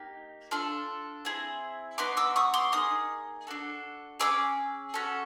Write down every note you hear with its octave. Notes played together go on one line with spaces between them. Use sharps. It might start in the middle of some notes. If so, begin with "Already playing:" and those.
Already playing: A#3 D#4 G4
D4 F4 A4
C4 E4 G#4
B3 D#4 F#4 C6 D6
D6 E6
C#6 D#6
C6 D6
A#3 D#4 G#4 D#6
D4 F#4 A4
C#4 E4 G#4 D6 E6
C#4 F#4 A4